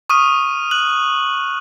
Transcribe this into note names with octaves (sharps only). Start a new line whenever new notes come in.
C#6 D#6 F6 D#7
F#6 F#7